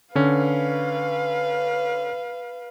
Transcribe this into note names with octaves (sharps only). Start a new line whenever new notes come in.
D3 C#4 B4 F5